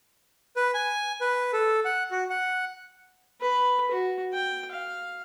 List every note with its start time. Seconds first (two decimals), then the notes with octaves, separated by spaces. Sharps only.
0.56 B4
0.74 G#5
1.21 B4
1.53 A4
1.85 F#5
2.11 F#4
2.30 F#5
3.41 B4
3.91 F#4
4.34 G5
4.72 F5